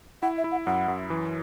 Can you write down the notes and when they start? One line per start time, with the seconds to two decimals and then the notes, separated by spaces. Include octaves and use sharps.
0.22 E4 F#5
0.38 E5
0.44 E4
0.52 F#5
0.66 F#2 F#5
0.88 F#2
1.10 E3